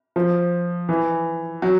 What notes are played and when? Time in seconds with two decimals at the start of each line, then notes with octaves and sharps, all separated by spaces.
0.16 F3
0.89 E3
1.62 F#3